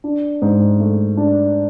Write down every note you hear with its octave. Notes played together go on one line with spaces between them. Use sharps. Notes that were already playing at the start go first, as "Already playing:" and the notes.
D4
G#2
A3
D4